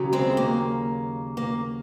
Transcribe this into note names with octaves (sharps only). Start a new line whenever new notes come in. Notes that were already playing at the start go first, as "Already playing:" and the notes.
Already playing: D#2 C#3 F#3
G#3 C4
A#3
A#3